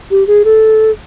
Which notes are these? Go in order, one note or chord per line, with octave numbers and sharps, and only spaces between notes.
G4
G#4
A4